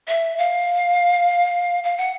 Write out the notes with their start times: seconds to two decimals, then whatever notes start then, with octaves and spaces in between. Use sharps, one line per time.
0.08 E5
0.38 F5
1.84 F5
1.97 F#5